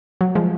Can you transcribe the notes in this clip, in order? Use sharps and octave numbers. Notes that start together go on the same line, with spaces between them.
F#3
F3 G#3